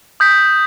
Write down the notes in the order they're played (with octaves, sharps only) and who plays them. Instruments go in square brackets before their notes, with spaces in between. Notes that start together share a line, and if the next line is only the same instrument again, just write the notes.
[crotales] D#6 G6 B6